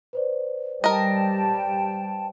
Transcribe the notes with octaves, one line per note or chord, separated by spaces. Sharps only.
B4 C5 D5
G3 A#4 D#5 G5 A5